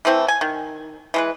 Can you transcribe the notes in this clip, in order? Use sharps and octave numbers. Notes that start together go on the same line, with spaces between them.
E3 A3 C4 E4
G#5
D#3
E3 G#3 B4